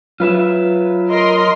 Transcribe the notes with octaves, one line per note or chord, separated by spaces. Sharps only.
F#3 F4 B4 E5
A#4 D#5 C6